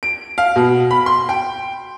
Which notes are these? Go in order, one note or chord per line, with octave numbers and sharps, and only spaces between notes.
D7
F5
B2
B5
C6
G5